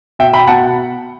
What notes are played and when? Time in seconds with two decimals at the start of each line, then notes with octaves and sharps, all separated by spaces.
0.19 B2 E5 G5
0.33 G5 B5
0.47 B2 F#5 A5